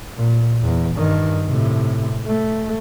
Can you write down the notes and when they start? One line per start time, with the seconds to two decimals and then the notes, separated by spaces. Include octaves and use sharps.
0.17 A#2
0.62 E2
0.96 G2 D#3
1.47 A2 C3
2.26 A3